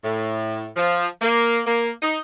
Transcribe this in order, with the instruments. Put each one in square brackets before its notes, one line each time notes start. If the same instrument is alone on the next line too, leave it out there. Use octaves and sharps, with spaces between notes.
[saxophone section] A2
F3
A#3
A#3
D#4